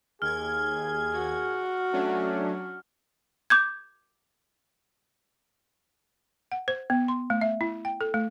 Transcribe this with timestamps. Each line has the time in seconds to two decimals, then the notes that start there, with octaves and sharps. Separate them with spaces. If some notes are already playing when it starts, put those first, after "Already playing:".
0.22 D#2 G#4 F6 G#6
1.13 F#4
1.93 F#3 A3 C#4 D4
3.50 D6 G6 G#6
6.52 F#5
6.68 C5
6.90 B3
7.08 C6
7.30 A3
7.41 E5
7.61 E4
7.85 G5
8.01 A4
8.14 A3